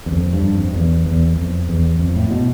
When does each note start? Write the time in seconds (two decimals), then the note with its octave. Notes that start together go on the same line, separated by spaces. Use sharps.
0.06 E2
0.12 F2
0.33 G2
0.55 F2
0.75 E2
1.06 E2
1.37 F2
1.69 E2
1.99 F2
2.16 A2
2.31 B2